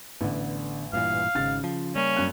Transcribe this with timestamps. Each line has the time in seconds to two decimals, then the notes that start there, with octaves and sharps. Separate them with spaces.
0.21 A1 D3 B3
0.93 G2 A#2 E3 F5
1.35 G#1 G#2 C#3 A6
1.64 F3
1.96 G3 A#3 C#4
2.16 F#2 F#6